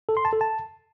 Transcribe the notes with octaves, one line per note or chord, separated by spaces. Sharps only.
A4
C6
A5
A4
A5